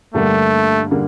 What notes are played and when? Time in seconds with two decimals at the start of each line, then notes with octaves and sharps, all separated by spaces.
0.14 G2 D3 G3 A3 A#3
0.91 D3 G3 A#3